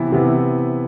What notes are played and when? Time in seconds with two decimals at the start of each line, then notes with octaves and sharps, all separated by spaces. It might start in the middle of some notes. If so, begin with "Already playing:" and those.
Already playing: C3 E3 B3 E4
0.12 C3 E3 B3 E4